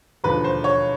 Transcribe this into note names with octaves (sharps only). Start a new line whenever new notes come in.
E1 D#2 D3 F3 B4
C5
C#5